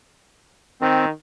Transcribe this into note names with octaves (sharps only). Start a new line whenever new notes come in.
D#3 C4